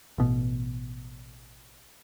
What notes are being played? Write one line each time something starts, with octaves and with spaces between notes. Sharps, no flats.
A1 B2